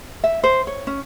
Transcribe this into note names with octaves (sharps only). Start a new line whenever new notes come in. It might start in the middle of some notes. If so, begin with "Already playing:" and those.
E5
C5
C#5
C#4